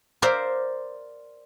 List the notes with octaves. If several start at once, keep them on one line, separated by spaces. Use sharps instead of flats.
A#4 C5 D5 E5 F5